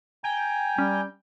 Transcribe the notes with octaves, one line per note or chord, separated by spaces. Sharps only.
G5 G#5 A#5
G3 C#4